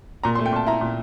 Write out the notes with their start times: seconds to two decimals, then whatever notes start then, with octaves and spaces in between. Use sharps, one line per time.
0.23 A#2 A#5
0.35 C6
0.39 A3
0.46 G5
0.53 A#2 A5
0.67 E4 A#5
0.81 A#2